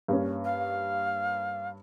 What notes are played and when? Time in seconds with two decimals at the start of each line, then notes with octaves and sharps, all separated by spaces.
0.08 G2 A#3 C#4
0.44 F5